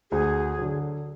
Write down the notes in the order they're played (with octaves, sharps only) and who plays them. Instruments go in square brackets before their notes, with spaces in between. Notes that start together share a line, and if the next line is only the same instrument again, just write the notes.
[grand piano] D2 [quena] G#4
[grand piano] D3 F#3